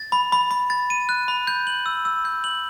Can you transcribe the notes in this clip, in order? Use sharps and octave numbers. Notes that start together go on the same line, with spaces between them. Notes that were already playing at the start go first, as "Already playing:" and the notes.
Already playing: A6
B5
B5
B5
A6
D#7
F#6
B5
G6
F#7
E6
E6
G6
F#7